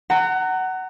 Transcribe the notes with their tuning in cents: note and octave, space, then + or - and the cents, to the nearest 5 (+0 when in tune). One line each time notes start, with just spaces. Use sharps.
F#5 +20 A#5 -25